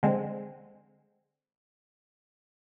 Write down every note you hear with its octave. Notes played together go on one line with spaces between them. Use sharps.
D3 G#3 C4